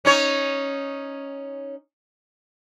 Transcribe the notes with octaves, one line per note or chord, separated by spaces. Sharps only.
C#4 D#4 C#5